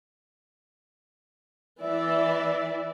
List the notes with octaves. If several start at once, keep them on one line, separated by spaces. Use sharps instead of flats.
E3 D5 E5